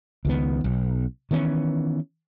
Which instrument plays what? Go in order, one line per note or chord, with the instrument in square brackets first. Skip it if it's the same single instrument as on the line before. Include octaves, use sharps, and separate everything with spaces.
[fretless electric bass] C#2 D#3 B3
B1
D#3 E3 B3 C#4